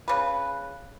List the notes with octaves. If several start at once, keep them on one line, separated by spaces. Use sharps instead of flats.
C#3 B4